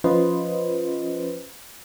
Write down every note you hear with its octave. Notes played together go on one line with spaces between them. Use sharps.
F3 C#4 F4 B4 C5 D#5